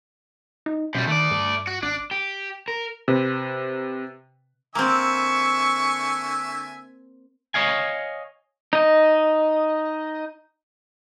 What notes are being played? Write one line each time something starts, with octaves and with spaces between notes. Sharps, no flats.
D#4
F#2 B2 G3
D#3 A3 D5
G2
F#4
G#1 D4
G4
A#4
C3 B4
D3 A#3 C4 E5 G#5 C#6
C#5 D#5 F5 G#5
D#4 D#5